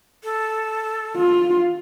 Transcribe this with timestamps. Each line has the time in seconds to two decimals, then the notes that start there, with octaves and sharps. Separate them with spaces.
0.24 A4
1.17 F4